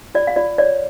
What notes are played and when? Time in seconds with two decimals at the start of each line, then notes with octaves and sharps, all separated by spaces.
0.15 F4 D5
0.27 F5
0.36 F4 D5
0.58 C#5 D5